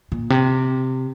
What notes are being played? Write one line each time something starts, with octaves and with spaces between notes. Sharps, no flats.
A#2
C3